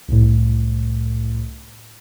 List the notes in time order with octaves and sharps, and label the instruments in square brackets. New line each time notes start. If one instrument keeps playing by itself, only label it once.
[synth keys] C2 A2